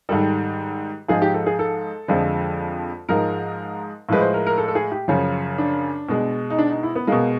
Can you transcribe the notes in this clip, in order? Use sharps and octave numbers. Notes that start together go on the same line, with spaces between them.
G#2 D#3 G3 A4
G#2 F3 G#3 G#4
G4
A4
G#4
A4
F2 D3 F3 G#3
G#2 F3 G#3 A#4
A2 F3 G#3 B4
C5
A#4
A#4
A4
A4
G#4
G4
F#2 C#3 F3 C#4
D4
B2 G#3
D#4
D4
D#4
E4
B3
B2 G#3 A#3